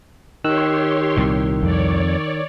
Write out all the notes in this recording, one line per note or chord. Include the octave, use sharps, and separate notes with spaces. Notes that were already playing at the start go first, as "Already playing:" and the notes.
D#3 G4 C#5 C6 E6 F#6
C2 A#2
F2 C#5 D5